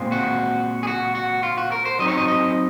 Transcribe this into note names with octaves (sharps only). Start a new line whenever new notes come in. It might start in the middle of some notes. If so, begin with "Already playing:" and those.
Already playing: A#2 G#3 C4
F#4
G#4
F#4
F#4
F4
F#4
A#4
C5
F#3 C4 D#4 D#5
C#5
D#5
D#5